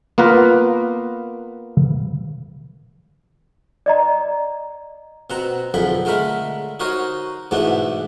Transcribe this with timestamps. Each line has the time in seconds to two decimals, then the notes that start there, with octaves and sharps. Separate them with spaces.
0.18 A#3 B3 F4 A#4 B4
3.86 D5 D#5 A#5
5.30 B2 C4 F#5 A#5
5.74 B1 F2 D3 G#4 G5 B5
6.05 D3 G#3 A3 A#4 B5
6.80 D#4 F#4 A#4 C5 C#5 D#5
7.51 G#2 B2 E3 A3 B3 D4